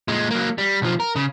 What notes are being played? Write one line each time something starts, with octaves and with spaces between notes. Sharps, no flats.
A#2 G#3
F#3 A#3
G3
B1 F3
A#4
C#3